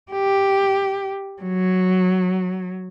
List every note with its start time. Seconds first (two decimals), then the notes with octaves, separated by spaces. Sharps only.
0.12 G4
1.42 F#3